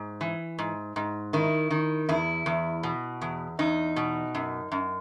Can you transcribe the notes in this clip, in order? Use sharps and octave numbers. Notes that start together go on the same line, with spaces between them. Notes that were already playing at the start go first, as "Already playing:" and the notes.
Already playing: G#2
E3
G#2
G#2
D#3 E4
D#3
E2 E4
E2
B2
E2
E2 D#4
B2
F#2
F#2